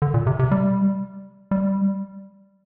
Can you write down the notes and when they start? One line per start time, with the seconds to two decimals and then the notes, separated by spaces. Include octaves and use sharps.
0.02 D3
0.14 A#2
0.27 C3
0.39 C3
0.51 G3
1.51 G3